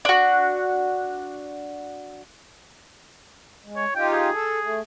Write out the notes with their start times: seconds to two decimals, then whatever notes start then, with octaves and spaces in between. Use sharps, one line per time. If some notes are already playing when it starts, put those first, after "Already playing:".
0.05 D4 F#4
3.64 G#3
3.76 C#5
3.95 D#4 F4 G4 G5
4.13 G#4
4.33 A4
4.61 A3